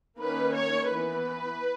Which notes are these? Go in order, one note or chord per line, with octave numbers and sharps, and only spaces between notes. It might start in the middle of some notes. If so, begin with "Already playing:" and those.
D#3 A#3 C#4 B4
C#5
E3 B3 B4